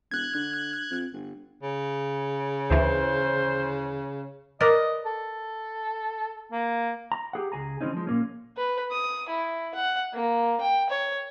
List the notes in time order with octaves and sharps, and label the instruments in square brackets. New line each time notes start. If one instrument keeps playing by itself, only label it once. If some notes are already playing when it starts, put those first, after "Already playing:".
[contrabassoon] E1 [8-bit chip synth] F#6 G#6
[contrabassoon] D3
F2
G1
[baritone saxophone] C#3
[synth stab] D2 E3 [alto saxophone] C5
[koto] A#4 B4 D5 [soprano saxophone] D#5
[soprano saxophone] A4
A#3
[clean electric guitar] A#5
G4 G#4 F#5
C#2 G#4 G#5 A#5
E3 F#3 G#3 C4 C#4 D#4
F3 G#3
A#2 A#3 C#4
[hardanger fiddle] B4
D#6
E4
F#5
A#3
G5
C#5